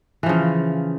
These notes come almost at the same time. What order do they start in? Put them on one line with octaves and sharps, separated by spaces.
E3 F3 C#3